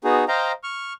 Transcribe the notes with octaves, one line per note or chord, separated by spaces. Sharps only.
B3 D#4 F#4 G#4
C5 D#5 F5 G5 A#5
C#6 F6